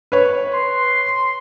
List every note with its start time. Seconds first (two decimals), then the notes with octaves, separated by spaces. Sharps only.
0.12 B4 C#5
0.54 C6